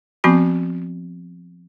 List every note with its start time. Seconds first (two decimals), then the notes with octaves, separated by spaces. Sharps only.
0.24 F3 B3 C4 F#4 B5